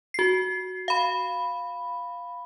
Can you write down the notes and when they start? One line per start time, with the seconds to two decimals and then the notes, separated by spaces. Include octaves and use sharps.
0.14 F#4 C7
0.88 F5 B5